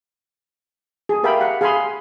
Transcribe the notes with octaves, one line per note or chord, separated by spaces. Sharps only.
G#4
G4 A#4 E5 F5 G5 B5
F5 F#5 A#5
G#4 F5 G#5 B5 C6